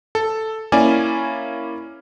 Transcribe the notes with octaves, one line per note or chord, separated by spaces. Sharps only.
A4
A#3 C#4 E4 D5 G#5